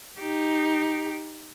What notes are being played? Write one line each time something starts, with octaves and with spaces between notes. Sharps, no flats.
D#4 G4